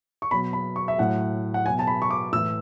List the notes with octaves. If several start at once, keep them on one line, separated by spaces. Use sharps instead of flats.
C#6
B2 F#3 B5
B5
C#6
E5
A2 F#3 F#5
F#5
B2 F#3 G#5
A5
B5
C#6
D6
A2 E3 E6